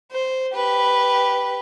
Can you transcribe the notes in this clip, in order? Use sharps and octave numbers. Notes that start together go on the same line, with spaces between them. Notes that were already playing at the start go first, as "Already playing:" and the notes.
C5
G4 B4